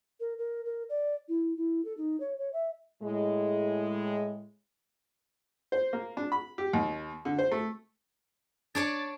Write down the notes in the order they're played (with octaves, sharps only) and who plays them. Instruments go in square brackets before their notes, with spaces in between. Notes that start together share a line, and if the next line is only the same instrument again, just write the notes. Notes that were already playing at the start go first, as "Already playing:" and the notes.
[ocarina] A#4
A#4
A#4
D5
E4
E4
A4
D#4
C#5
C#5
E5
[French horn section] A2 G#3
[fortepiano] C5
A#3
D4
B5
G4
D#2
D3
C5
A3
[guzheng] D4 C#5 D5 [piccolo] A6